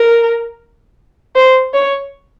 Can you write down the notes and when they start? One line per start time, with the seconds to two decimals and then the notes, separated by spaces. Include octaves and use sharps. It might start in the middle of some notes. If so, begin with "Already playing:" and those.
Already playing: A#4
1.36 C5
1.74 C#5